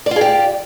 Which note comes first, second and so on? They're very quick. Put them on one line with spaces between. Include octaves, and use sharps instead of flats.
D5 F4 G#4 G4